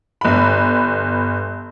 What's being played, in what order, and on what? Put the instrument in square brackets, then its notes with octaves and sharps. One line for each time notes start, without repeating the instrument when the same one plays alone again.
[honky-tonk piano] G1 B5